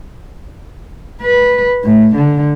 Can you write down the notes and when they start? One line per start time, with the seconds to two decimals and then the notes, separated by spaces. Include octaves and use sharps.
1.22 B4
1.84 A2
2.15 D3